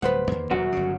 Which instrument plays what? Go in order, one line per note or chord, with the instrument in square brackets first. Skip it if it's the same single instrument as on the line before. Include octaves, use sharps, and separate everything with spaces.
[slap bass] D1 G3 [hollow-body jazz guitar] B4 C5 F#5
[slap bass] E2 D#3 A#3
[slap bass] D#1 [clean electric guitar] F#2 F#4
[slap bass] G1 C#3